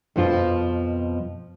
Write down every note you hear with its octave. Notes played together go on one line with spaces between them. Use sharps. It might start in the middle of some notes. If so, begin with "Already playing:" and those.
F2 B2 F3 F4